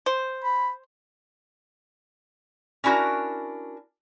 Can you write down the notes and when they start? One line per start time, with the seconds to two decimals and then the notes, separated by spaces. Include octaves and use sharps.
0.06 C5
0.44 B5
2.84 C#4 D4 E4 F#4 A#4